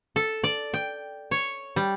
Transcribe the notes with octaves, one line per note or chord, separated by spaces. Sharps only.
A4
D5
G5
C#5
G3